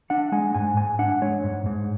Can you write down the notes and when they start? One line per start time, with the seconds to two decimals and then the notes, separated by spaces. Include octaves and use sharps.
0.10 D4 F#5
0.32 G#3 G#5
0.55 G#2 G#5
0.77 G#2 G#5
0.99 D4 F#5
1.22 G#3 C#5
1.44 G#2
1.66 G#2